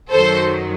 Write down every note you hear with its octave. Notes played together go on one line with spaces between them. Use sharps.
F#2 D#3 F#3 A4 C5